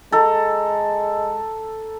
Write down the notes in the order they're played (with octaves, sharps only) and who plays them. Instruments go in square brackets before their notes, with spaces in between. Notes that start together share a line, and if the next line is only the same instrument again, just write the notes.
[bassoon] G#3 [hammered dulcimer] A4 A#5